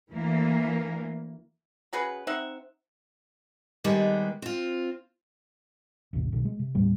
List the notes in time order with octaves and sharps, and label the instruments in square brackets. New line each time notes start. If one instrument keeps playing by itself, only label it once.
[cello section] D2 E3 A#3
[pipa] C#3 F#4 G#4 B4
C4 D#4 E5 F#5
[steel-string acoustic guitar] D3 D#3 G3 G#3 B3
C4 F4
[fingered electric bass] A1 D#2 C3
B1 B2 D3
G#3
C3
D#2 A2 G3 B3